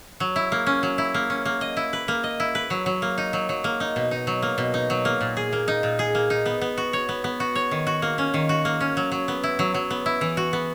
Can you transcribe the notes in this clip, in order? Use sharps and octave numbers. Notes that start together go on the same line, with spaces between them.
F#3
E4
A#3
C#4
F#3
E4
A#3
C#4
A#3
D#5
E4
B4
A#3
D#5
E4
B4
F#3
F#3
A#3
D#4
F#3
F#3
A#3
D#4
B2
D#4
F#3
A#3
B2
D#4
F#3
A#3
A#2
G#4
A#3
D#4
A#2
G#4
A#3
D#4
B3
B3
F#4
C#5
B3
B3
F#4
C#5
D#3
F#4
A#3
C#4
D#3
F#4
A#3
C#4
F#3
F#3
B3
E4
F#3
F#3
B3
E4
E3
F#4
B3